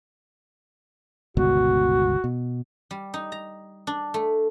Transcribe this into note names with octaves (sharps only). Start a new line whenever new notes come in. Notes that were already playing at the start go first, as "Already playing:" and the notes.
G1 C#2 B2 F#4
B2
G3
D#4
A#5
D4
A3